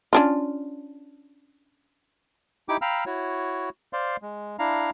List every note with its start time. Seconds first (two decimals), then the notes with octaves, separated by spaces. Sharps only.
0.13 C#4 D4 F4
2.69 D#4 E4 G4 G5 D6
2.82 F5 G5 A#5 B5 E6 F6
3.06 E4 F#4 C#5
3.93 C5 D5 F5 C6
4.22 G#3
4.59 D4 E4 F5 A#5